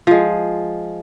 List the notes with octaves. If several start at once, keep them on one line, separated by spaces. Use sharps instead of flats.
F3 G#3